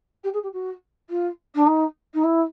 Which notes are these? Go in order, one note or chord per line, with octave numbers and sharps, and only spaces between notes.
G4
G#4
G4
F#4
F4
D4
D#4
D#4
E4